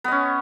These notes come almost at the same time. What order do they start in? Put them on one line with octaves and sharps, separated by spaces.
B3 D#5 C#4